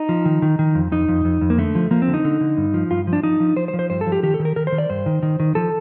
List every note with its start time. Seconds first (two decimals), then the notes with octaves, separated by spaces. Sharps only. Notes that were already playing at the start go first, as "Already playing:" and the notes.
Already playing: D#4
0.09 F3
0.25 D#3
0.42 D#3
0.59 D#3
0.75 F2
0.92 F2 D#4
1.09 F2
1.25 F2
1.41 F2
1.50 A#3
1.58 D3 A3
1.75 F3
1.91 F3 A#3
2.02 C4
2.08 D3
2.14 D#4
2.24 D3
2.41 D3
2.57 G2
2.74 F3
2.91 G2 F4
3.07 F3
3.13 D4
3.23 F3 D#4
3.40 F3
3.57 F3 C5
3.68 C5
3.74 F3
3.79 C5
3.90 G2 C5
4.01 A4
4.06 F3
4.12 G4
4.23 D#3 G4
4.34 A4
4.39 D#3
4.45 A#4
4.56 D#3 A#4
4.67 C5
4.72 D#3
4.78 D5
4.90 G2 C5
5.06 D#3
5.23 D#3
5.40 D#3
5.55 F3 A4